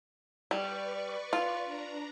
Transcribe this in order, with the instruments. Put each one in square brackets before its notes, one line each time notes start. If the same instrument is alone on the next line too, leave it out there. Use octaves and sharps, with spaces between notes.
[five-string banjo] G3 [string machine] B4 D5 C#6
[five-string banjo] F4
[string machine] D4 A#5